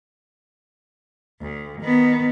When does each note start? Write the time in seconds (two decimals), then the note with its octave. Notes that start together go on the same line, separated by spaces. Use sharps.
1.42 D2
1.82 D#3 B3